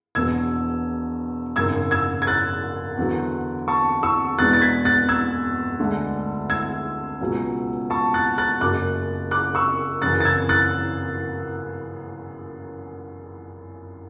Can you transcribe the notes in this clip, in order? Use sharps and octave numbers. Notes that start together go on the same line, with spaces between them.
E1 E2 B2 E6 G#6
G#1 F#2 C#3 E6 G#6
E6 G#6
G#6
F#6 A6
E2 D3 F#3
A5 C#6
C#6 E6
E2 B2 G#3 D4 F#6 A6
A6
G#6 B6
F#6 A6
E6 G#6
D2 D3 G#3 D4
E6 G#6
C#2 B2 F#3 C#4
A5 C#6
F#6 A6
F#6 A6
F#1 F#2 C#3 F#3 D6 F#6
D6 F#6
C#6 E6
F#2 C#3 E3 F#6 A6
A6
E6 G#6
F#6 A6